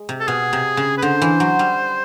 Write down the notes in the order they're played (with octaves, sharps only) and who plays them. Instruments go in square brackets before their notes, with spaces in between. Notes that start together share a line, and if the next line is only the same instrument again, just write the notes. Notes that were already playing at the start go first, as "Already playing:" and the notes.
Already playing: [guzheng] G#3
C3
[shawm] A4
[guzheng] B2 [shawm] G#4
[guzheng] C3
C#3
[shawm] B4
[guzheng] D3 [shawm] C5
[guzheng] E3
F#3
G3